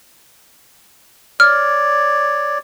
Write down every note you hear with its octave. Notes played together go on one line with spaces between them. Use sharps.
C#5 D5 F6